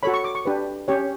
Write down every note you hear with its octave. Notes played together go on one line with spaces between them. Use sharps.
F#4 A4 C#5 B5
C#6
D6
C#6
D4 G4 B4
C#4 G4 C#5